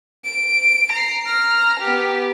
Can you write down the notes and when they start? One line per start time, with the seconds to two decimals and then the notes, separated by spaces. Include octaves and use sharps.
0.24 D7
0.92 A#5 C7
1.26 A#5 F6
1.80 B3 G4